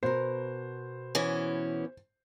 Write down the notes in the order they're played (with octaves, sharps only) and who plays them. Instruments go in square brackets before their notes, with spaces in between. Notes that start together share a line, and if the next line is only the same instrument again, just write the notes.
[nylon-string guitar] B2 A#4 [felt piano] C5
[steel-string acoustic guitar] E3 B3 C#4